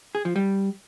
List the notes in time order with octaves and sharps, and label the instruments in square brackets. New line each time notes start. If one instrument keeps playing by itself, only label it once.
[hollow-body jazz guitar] G#4
F3
G3